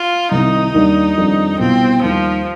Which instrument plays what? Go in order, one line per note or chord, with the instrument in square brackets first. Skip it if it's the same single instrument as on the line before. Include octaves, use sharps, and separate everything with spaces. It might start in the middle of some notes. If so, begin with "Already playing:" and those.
Already playing: [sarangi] F4
[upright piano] C2 C3 D#3 [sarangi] D#4
[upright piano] D#2 D#3 G3 D4
F2 D#3 G3 D4
[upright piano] C2 B2 B3 F4 [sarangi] C4
[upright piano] D#2 D#3 G3 [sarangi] F3